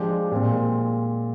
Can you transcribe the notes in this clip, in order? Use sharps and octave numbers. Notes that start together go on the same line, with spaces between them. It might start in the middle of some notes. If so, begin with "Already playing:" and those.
Already playing: F3 G#3 D4 G4
A#2 G#3 C4